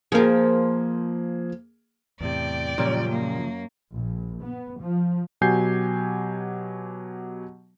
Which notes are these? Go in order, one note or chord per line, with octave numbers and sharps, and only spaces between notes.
F3 A#3 G#4 A#4
E2 A2 C3 D5 G5
F#2 A#2 C#3 F3 G3
A#3
A#1
B3
F3
B2 F#3 G4 G#5 G6 C7